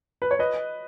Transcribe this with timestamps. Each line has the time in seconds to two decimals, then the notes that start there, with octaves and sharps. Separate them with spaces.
0.22 B4
0.31 C#5
0.39 B4 D#5